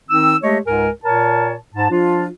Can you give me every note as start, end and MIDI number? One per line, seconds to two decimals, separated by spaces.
0.09 0.35 51
0.09 0.35 60
0.09 0.35 63
0.09 0.35 88
0.42 0.58 56
0.42 0.58 57
0.42 0.58 67
0.42 0.58 73
0.42 0.58 75
0.66 0.89 37
0.66 0.89 44
0.66 0.89 56
0.66 0.89 70
0.66 0.89 80
1.04 1.54 46
1.04 1.54 70
1.04 1.54 73
1.04 1.54 81
1.75 1.90 44
1.75 1.90 81
1.91 2.27 53
1.91 2.27 62
1.91 2.27 65